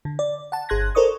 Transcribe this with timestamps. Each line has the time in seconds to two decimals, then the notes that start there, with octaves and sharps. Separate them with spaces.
0.05 D3
0.19 D5
0.52 F#5 A5
0.69 G1 G#4 C6 F#6 G#6 A#6
0.95 A4 A#4 C5 D5 C#6 D#6